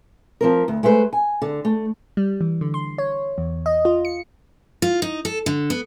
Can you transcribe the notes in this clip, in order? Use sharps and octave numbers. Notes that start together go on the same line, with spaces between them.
F3 C4 A#4
D2
G#3 A3 B4 C5
G#5
D3
A3
G3
E3
D3
C6
C#5
E2
D#5
F4
C#7
F4
D#4
A4
D3
B3